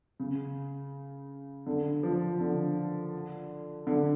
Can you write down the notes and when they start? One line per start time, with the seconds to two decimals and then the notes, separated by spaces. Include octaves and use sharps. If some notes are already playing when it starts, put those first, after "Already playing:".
0.20 C#3
1.67 D3
2.03 F3
2.41 D3
3.87 D3